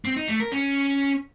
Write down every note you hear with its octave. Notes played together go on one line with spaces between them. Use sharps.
C4
D#4
A3
A#4
C#4